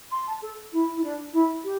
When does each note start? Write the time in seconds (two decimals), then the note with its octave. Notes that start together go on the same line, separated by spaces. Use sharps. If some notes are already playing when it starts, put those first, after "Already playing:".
0.11 C6
0.27 A5
0.42 A4
0.72 E4
0.95 E4
1.03 D4
1.33 E4
1.64 G4